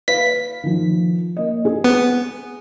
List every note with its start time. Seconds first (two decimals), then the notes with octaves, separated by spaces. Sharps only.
0.08 B4 F5 B6
0.63 D#3 F3
1.37 A#3 D#5
1.65 G#4
1.84 B3